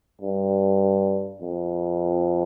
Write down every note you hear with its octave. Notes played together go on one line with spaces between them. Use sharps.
G2
F2